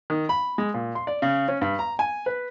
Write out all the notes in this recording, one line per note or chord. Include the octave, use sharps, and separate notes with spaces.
D#3
B5
G#3
A#2
C6
D5
C#3
C#4
G2
A#5
G#5
B4